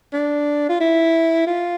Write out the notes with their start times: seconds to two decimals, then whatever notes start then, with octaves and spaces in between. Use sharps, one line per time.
0.13 D4
0.69 F4
0.80 E4
1.47 F4